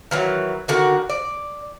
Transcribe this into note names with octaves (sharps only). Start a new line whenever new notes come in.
D#3 E3 F#3
D3 D#3 F#4
D5